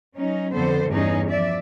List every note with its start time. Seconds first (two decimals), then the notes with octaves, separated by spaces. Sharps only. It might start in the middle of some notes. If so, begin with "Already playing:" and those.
0.16 F#3 C#4 D#4
0.54 F2 D3 B3 A4 C5
0.89 E2 G2 G3 C#4 D#4 G#4
1.30 F3 D5 E5